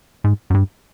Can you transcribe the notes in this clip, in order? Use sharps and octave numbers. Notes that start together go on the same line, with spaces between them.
G#2
F#2
G2